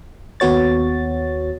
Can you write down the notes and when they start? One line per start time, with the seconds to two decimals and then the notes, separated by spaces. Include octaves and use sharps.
0.40 D#2 B3 F#4 C#5 A6